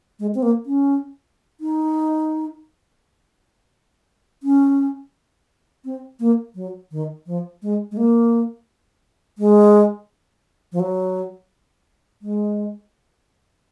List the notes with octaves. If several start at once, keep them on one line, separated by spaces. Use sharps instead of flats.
G#3
C4
A#3
C#4
D#4
C#4
C4
A#3
F#3
D#3
F3
G#3
G#3
A#3
G#3
F3
F#3
G#3